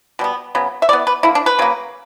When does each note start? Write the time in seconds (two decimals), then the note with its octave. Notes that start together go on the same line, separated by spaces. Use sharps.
0.19 B2 G3 B3
0.55 C#3 F#3 B3
0.82 E5
0.89 E3 B3 D5
1.07 B4
1.23 D3 A#3 E4
1.35 D4
1.46 B4
1.59 C#3 F#3 A#3